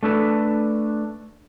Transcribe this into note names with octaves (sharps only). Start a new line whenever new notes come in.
A3 D4 A4 B4